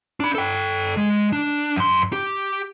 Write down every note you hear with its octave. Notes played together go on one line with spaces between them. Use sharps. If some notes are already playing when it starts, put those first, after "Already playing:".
D4 B5
A4 G5
G#3
D4
F#2 C6
G4